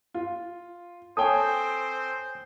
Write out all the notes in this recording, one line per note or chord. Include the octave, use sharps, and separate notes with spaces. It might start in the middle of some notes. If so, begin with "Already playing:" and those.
F4
C4 A4 C5 C#5 G5 G#5 D#6